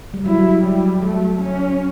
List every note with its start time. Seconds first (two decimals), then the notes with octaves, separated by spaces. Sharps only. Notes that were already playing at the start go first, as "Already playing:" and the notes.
0.14 G3
0.26 F#3 E4
0.64 F#3 G3
1.02 F#3 A3
1.41 C#4